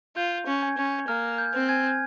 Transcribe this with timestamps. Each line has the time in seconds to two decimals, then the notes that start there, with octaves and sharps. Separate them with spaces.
0.16 F4 G6
0.46 C#4
0.62 G#5 G#6
0.77 C#4
1.08 A#3 F6
1.38 G6
1.54 C4
1.69 G#5 G#6